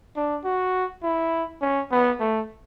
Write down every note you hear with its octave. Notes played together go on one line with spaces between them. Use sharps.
D4
F#4
E4
C#4
B3
A3